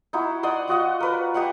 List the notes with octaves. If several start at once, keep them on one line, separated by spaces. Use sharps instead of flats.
D#4 E4 F#4
D5 D#5 F#5 C6
F4 F#4 D#5 F#5
A#4 B4 D5
G4 D#5 F#5 C#6